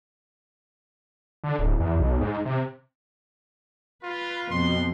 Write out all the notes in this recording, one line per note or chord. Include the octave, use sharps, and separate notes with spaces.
D3
D1
E2
B1
G#2
C3
F4 B4
F2 B2 C6